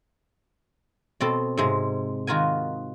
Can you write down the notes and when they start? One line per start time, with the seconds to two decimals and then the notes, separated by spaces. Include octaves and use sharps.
1.20 B2 C4 A4
1.57 G#2 C3 G#3
2.27 D#3 F4 F#4 A#4 G#5